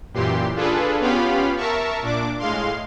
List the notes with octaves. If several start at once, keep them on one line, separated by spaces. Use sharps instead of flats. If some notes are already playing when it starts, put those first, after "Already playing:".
F#2 A#2 E3 G4 C6
D4 F4 G#4 A4 B4
B3 C#4 F4 G4 F5 B5
A#4 E5 A5 C#6
A#2 D4 D6
A2 G#3 F5 C6